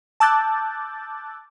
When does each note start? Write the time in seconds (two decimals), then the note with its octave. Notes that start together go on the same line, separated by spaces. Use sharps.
0.20 A5 D6 E6 F#6 G6 A6